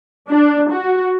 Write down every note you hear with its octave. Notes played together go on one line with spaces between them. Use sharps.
D4
F#4